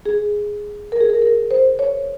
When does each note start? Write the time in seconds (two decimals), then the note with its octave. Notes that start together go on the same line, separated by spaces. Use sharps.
0.06 G#4
0.92 A#4
1.01 G#4
1.10 A#4
1.22 A#4
1.51 C5
1.79 C#5